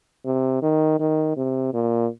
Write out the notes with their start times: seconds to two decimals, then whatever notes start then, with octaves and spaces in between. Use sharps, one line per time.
0.25 C3
0.62 D#3
0.99 D#3
1.37 C3
1.74 A#2